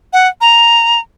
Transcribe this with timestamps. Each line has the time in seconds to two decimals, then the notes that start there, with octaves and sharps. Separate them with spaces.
0.13 F#5
0.41 A#5